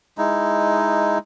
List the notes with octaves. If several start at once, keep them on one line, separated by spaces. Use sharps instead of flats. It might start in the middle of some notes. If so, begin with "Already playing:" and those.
G#3 D#4 E4